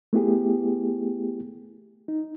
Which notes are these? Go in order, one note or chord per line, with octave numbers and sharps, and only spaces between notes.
A3 B3 E4 G4 G#4
D#4